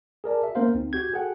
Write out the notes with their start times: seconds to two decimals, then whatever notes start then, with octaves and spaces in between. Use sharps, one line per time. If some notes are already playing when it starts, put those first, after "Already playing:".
0.24 G#4 A#4 D5 A5
0.43 F#4 E5
0.55 A#3 B3 C#4 A#4 C5 F5
0.74 D2 C4 D#4
0.93 F#4 G4 G6 G#6
1.12 F#4 G#4 A4 F#5 G5